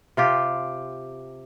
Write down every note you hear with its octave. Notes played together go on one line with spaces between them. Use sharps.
C3 F4 G4